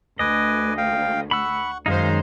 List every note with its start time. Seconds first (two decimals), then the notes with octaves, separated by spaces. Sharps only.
0.19 D2 B4 D#5 G#5 D6
0.78 F5 G5
1.31 F#5 B5 C#6 E6
1.86 F#2 D#3 G#3 D#4 C5 F5